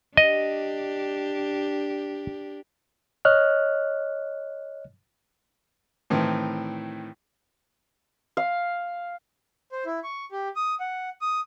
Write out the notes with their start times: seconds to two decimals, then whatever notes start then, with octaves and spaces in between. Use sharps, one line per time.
0.17 D4 G4 D#5
3.25 C#5 D#5 F6 F#6
6.10 A2 D#3 E3 C4
8.37 F5
9.71 C5
9.86 E4
10.04 C#6
10.32 G4
10.56 D#6
10.80 F#5
11.21 D#6